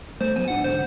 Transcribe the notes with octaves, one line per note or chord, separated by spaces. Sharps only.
A3 C5
F#3 B3 G#5
D1 G#2 D4 F#5
C2 G#2 D3 C5